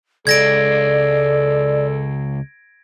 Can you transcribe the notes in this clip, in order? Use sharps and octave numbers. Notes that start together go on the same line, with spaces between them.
C#2 G#3 A4 D5 G#6 A#6 D7